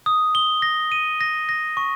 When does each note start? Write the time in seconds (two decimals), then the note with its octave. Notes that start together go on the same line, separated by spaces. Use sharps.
0.06 D#6
0.35 G7
0.62 A#6
0.92 D#7
1.21 A#6
1.49 A#6
1.77 C#6